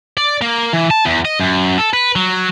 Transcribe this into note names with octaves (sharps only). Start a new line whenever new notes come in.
D5
A#3
E3
A5
E2
D#5
F#2
A4
B4
F#3